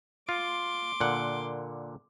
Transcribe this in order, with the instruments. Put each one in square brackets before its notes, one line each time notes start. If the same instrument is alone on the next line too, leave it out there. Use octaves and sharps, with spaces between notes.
[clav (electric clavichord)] F4 [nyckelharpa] C6 D6
[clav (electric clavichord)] A#2 D3 F#5